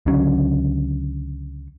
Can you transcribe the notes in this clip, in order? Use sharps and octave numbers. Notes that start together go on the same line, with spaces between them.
C#2 D3 F#3 C#4